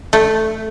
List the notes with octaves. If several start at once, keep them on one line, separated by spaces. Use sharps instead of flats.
A3